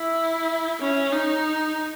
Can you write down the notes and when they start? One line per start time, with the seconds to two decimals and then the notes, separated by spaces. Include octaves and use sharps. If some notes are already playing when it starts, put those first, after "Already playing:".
Already playing: E4
0.80 C#4
1.13 D#4